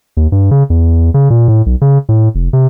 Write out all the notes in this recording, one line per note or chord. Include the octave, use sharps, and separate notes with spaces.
D#2
G2
C#3
E2
C#3
A#2
A2
B1
C#3
A2
F1
C3